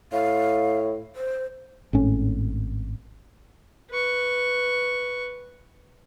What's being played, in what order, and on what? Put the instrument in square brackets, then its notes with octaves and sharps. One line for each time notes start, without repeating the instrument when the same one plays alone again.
[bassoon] A2 [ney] F5
[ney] C5
[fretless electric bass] G#1 A2 C#4
[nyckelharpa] B4 C#6